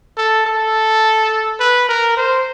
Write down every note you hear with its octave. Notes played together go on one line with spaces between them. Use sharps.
A4
A4
B4
A#4
C5